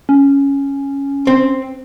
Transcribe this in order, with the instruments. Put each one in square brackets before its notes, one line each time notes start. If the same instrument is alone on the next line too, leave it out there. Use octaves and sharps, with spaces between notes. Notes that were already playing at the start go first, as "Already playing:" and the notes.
[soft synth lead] C#4
[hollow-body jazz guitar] C4